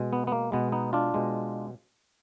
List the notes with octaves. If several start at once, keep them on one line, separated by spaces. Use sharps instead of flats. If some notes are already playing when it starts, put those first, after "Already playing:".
Already playing: B2 G#3
B3
B3
A#3
B2 G#3 B3
B3 D#4
D4 F4
B2 G#3